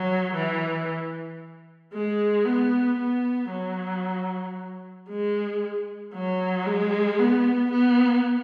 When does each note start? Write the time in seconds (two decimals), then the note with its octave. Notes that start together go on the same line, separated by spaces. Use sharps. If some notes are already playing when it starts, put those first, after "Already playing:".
Already playing: F#3
0.34 E3
1.93 G#3
2.45 B3
2.98 B3
3.50 F#3
5.09 G#3
6.13 F#3
6.66 G#3
7.19 B3
7.71 B3